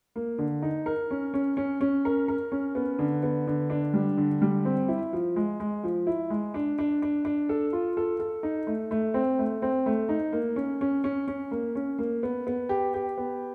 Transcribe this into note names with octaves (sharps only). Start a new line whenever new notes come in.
A#3
D3
D#4
A#4
C#4
C#4
C#4
C#4
A#4
A#4
C#4
B3
D3
B3
D3
D4
G3
D3
G3
C4
E4
F3
G#3
G#3
F3
E4
G#3
D4
D4
D4
D4
A4
F4
A4
A4
D#4
A3
A3
C4
A3
C4
A3
D#4
A#3
C#4
C#4
C#4
C#4
A#3
C#4
A#3
B3
B3
G4
G4
B3